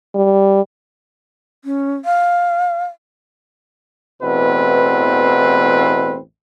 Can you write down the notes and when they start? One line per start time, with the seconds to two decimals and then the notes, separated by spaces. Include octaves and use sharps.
0.15 G3
1.65 C#4
2.05 F5
4.22 A1 E2 B2 C4 B4